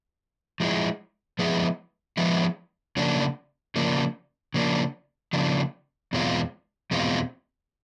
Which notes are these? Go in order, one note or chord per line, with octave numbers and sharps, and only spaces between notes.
F3 G#3 B3 E4 G#4
F3 G#3 B3 E4 G#4
F3 G#3 B3 E4 G#4
C#3 F3 A#3 D4
C#3 F3 A#3 D4
C#3 F3 A#3 D4
C#3 F3 A#3 D4
E2 B2 G#3 C4 F4
E2 B2 G#3 C4 F4